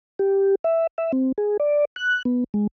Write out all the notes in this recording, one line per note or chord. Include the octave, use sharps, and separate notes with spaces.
G4
E5
E5
C4
G#4
D5
F#6
B3
G#3